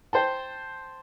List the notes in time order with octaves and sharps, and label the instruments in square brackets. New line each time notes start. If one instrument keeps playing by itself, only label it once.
[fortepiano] C5 G5 A5